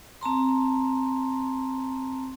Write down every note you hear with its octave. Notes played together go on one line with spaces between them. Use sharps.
C4 A5 A#5 C6